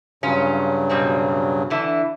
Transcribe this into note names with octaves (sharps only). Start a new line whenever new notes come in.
G2 C#3 F#3 C#4 F4
B2 G3 C4
D3 E3 E4